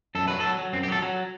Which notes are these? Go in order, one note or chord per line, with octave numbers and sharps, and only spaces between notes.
F#2 A4
F#3 B4
F#3 A4
F#3
F#2 C4
G4
F#3 A4
F#3